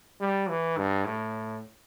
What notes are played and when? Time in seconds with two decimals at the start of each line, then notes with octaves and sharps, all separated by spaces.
0.21 G3
0.49 E3
0.77 G2
1.05 A2